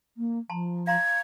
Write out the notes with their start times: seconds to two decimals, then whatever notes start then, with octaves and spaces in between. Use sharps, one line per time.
0.17 A#3
0.50 F3 A5 A#5 C6
0.87 F5 A#5 C6 G#6